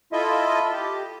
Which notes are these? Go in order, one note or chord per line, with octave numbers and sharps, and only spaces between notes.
E4 F4 A4 D#5 E5
G4